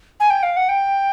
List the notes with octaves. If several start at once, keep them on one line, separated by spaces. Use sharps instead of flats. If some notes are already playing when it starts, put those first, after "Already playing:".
G#5
G5
F5
F#5
G5